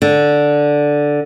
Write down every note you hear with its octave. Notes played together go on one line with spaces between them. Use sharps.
D3